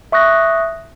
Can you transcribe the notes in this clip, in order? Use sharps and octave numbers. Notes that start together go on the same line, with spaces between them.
E5 C#6 D#6 F#6 A#6